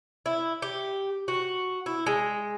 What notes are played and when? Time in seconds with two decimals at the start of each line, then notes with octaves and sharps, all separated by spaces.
0.26 E4
0.62 G4
1.28 F#4
1.86 E4
2.07 G#3